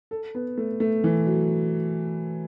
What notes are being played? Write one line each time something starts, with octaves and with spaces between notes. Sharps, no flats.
A4
B3
A3
A3
E3
F#3